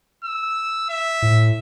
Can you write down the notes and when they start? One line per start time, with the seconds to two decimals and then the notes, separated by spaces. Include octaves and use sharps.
0.24 E6
0.89 E5
1.22 A2